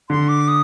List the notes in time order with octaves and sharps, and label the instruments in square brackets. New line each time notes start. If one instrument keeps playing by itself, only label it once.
[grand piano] D3 [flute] C6
[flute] D6
D#6